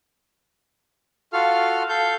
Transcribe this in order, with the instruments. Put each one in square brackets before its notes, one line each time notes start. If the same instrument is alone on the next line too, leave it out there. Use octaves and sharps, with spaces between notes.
[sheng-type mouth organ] F4 F#4 A4 F5 F6
A4 F5 G6